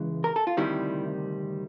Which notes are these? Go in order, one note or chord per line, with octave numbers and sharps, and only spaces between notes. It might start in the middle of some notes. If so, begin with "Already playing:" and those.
Already playing: C#2 C#3 E3 G#3
A#4
A4
F4
D2 C3 D#3 G3 E4